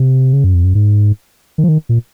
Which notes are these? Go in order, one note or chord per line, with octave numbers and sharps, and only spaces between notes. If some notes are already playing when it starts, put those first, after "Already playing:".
Already playing: C3
C#3
F#2
F2
F#2
G#2
D#3
F3
D#3
A#2